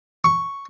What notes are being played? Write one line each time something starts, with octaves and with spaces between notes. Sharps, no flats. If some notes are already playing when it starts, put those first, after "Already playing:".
C#6